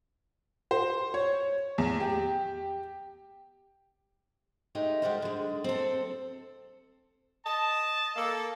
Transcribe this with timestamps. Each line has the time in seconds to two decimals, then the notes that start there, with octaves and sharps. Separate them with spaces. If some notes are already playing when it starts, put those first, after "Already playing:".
0.71 C5
1.14 C#5
1.78 E2
2.00 G4
4.75 G#3 A3 D#4 G4
5.02 G#3 F#4 G4 A4 A#4 C5
5.22 D3 G#3
5.64 C4 A4
7.46 D#5 A5
8.16 A#3 A4